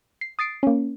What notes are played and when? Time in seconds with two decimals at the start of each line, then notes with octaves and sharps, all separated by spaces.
0.21 C7
0.39 D#6 A6 C7 D7
0.63 A#3 C#4